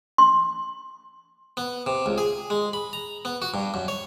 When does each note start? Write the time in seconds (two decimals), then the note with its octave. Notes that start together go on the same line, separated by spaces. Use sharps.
0.18 C6
1.57 B3
1.86 C3
2.06 C#2
2.18 G#4
2.50 G#3
2.73 B5
2.93 A#5
3.25 B3
3.42 F#4
3.54 G2
3.74 F#2
3.88 C#5